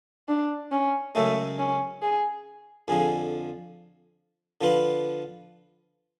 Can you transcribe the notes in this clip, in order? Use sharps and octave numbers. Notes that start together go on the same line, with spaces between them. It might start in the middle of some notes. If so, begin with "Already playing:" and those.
D4
C#4
F#2 C#3 G#3 A3
C#4
G#4
F2 D3 F3 G#4
D3 F3 B3 F4 B4